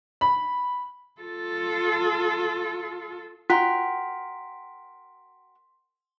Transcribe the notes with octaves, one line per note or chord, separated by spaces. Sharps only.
B5
F4 A4
F4 F#4 A#4 G5 C6 B6